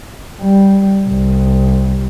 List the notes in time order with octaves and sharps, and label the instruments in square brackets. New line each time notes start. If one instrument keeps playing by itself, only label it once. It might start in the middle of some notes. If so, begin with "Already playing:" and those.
[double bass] G3
C2